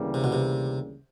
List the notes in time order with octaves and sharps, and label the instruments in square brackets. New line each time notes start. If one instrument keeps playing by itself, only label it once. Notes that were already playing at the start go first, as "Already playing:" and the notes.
Already playing: [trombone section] D2 C#3 E3 G3 A#3
[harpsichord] C3
B2
C3